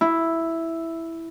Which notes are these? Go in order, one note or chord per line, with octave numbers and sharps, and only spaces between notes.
E4